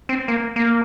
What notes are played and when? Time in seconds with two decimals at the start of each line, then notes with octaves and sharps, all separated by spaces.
0.09 C4
0.28 A#3
0.56 A#3